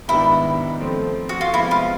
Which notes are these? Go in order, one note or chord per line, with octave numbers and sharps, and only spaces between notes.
G#2 D#3 G3 B3 D4 E4
F3 A3 C4
F#4
F4
C3 F3 G#3 B3 E4
F4